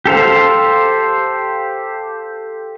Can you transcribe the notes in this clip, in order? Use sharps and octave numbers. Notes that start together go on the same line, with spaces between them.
G4 A4 C5 F5